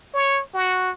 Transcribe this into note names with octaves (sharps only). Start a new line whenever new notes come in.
C#5
F#4